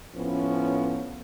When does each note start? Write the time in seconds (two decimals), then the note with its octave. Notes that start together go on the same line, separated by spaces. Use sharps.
0.15 A2 F3 B3 C#4 B4